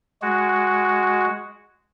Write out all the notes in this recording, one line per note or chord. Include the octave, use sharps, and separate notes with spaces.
G#3 F#4